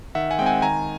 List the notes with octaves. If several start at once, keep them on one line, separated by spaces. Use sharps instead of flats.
D#3 E5 F#5
F#5 G#5
G#3 C4 G5
F#5 G#5
D#3 G#5 A#5